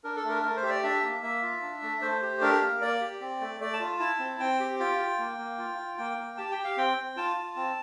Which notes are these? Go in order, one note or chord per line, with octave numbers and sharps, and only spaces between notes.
D4 A#4
A4
A3 A#4
A3 A#4
C5
G4 E5
D5
D4 E5
A#3
A#3 E5
F4
D4
A3
A3 C5
G4
D4 A#4
A#3
A#3 D5
G4
C4
A3
A3 D5
A5
F4
E4 A5
C4
C4 G5
G4
F4 G5
F4
A#3
A#3
F4
F4
A#3 G5
A#3
G4 A5
G5
G4
F5
C4 G5
C4
F4 A5
F4
C4